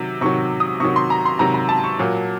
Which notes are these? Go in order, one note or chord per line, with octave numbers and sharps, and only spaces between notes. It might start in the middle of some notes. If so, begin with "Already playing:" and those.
Already playing: C3 D#3 F#3
C3 D#3 F#3 C#6
D#6
C3 D#3 F#3 C#6
C6
A#5
C6
C3 D#3 F#3 A#5
A#5
A5
C#6
A#2 F#3